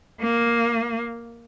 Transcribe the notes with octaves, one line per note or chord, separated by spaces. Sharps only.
A#3